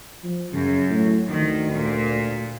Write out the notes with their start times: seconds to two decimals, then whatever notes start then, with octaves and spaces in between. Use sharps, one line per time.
0.24 F3
0.53 F#2 C#3
0.90 A2
1.29 D2 D#3
1.74 A#2